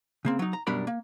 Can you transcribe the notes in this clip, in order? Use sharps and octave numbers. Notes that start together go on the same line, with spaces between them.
C#3 A#3 C4
F#3 D#4
A#5
F#2 B2 G3 D4 A#4 B5
A#3